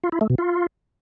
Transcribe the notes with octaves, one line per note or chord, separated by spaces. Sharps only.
F4
E4
A3
B2
F4